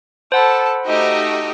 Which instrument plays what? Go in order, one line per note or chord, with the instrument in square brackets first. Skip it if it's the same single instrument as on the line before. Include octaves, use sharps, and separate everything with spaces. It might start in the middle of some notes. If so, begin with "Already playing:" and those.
[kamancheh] A4 A5 [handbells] C5 F#5 B5
[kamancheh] A3 F#4 [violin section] D#4 G4 D#5